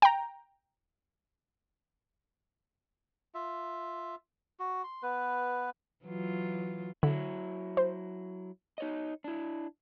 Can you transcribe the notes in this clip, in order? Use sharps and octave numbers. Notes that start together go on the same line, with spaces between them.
G5 A#5
F4 E5
F#4
C6
B3 B4
E3 F#3 F4
D3 F#3 E4
C5
D#4 C#5 D#5
D4 E4